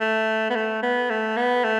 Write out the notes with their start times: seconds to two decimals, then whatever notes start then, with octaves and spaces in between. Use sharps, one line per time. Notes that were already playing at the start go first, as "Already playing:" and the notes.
0.01 A3
0.50 B3
0.55 A3
0.82 B3
1.10 A3
1.37 B3
1.64 A3